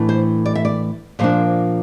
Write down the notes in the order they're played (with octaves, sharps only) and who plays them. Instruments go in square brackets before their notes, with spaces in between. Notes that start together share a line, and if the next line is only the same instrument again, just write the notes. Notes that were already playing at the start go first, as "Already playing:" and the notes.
Already playing: [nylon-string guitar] A2 E3 A3 D4
C5
D5
E5
D5
A#2 F3 A#3 D4 C5